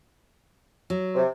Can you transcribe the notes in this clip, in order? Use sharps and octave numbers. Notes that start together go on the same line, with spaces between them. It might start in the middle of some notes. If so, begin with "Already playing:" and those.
F#3
C3